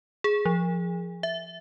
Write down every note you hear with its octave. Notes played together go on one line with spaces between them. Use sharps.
G#4
F3
E5